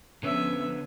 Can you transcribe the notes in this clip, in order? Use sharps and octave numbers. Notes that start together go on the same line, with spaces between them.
D3 F3 B3 C#4 B4 C#5 E5